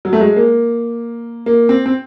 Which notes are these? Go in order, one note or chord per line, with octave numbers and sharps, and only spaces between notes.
F#3
A3
G#3
A#3
A#3
C4
C4